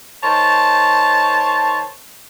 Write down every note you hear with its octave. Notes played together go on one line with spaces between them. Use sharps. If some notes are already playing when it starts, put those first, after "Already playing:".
D#3 C5 C#5 A5